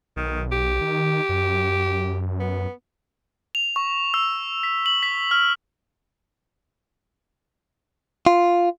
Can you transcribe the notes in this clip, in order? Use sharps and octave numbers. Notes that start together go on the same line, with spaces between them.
B1 D#3
G4
D#3
F#2
B3
F7
C#6
E6
B6
F#7
B6
F6
F4